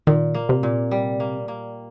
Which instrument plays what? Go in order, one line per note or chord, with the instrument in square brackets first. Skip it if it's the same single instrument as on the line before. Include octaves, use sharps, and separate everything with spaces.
[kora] A#2 [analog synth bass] D#3
[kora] A#3
[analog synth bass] C3
[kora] A#2
G3
A#3
A#3